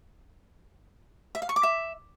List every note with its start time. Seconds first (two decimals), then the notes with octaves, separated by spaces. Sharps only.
1.35 E5
1.42 F5
1.49 C#6
1.56 D6
1.63 E5